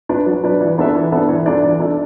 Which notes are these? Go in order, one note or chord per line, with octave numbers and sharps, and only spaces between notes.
D4 B4 D5
F#3
D4 B4 D5
E3
B3 D4 A4 E5
E3
B3 D4 A4 E5
E3
D4 A4 D5
E3
D4 A4 D5